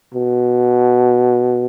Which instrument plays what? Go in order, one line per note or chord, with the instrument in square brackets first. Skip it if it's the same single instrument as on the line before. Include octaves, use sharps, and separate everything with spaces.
[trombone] B2